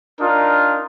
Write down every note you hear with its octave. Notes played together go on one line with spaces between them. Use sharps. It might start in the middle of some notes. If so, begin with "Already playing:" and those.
D4 D#4 F4 A#4